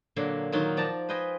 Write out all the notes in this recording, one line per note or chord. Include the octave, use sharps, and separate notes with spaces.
A#2 D3 F#3 A#3
D#3 F#3 D#4 F4 F#4
F3 D5 A5 A#5
B4 C5 D#5 G5 G#5